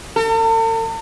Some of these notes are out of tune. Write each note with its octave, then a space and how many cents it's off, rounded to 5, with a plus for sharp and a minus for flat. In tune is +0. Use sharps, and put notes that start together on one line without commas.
A4 +45